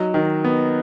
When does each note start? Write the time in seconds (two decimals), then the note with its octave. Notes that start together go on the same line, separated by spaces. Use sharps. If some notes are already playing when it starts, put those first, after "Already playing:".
Already playing: F#3 D#4
0.14 D#3
0.44 B3